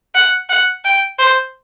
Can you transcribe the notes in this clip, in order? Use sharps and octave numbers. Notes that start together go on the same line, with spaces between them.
F#5
F#5
G5
C5